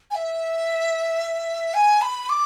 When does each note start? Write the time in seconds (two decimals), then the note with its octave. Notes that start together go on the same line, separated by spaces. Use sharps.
0.11 G#5
0.15 E5
1.74 G#5
2.02 B5
2.29 D6